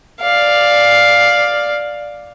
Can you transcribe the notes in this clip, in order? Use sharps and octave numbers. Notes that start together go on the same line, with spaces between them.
D5 F5